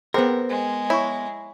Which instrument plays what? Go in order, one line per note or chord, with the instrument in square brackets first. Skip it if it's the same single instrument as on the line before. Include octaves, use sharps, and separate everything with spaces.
[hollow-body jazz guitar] B3 A#4 [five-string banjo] C4 [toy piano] G#4 C5 G5
[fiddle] G#3
[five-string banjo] E4 [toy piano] C#5 C#6